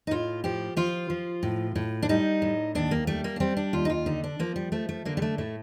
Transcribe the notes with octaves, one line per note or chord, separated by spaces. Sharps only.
D#4
A2 F4
F3 G4
F3 F4
F3
A2
A2
D4
G3 D#4
A2
D#2 D4
A#3
G3 A3
A#3
D4
G3 C4
D4
D#2 F4
D#4
F4
D3 D#4
D4
F3 A#3
G3
F3 A3
A3
D3 A#3
G3
A3
A2 A3